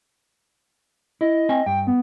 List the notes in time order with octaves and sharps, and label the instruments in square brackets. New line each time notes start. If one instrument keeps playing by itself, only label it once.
[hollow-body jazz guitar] E4 [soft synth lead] D#5
[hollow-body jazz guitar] C4 G#5
[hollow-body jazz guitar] G2 [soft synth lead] G5
[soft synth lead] B3